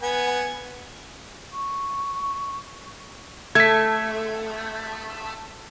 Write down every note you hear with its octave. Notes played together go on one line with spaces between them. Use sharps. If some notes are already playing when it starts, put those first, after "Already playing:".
B3 F#5 G#5
C#6
A3 G#6 B6